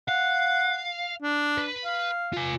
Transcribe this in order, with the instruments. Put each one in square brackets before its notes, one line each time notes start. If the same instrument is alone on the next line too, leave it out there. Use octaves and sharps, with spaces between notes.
[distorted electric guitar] F5 [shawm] F#5
[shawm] D4
[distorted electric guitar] B4
[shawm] F5
[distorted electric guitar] F4 G#5